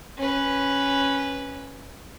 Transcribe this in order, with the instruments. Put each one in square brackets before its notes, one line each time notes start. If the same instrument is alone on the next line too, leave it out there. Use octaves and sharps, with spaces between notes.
[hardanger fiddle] C#4 B4